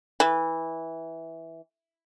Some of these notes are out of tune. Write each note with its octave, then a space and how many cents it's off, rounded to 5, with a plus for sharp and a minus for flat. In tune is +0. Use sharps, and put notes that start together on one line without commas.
E3 -10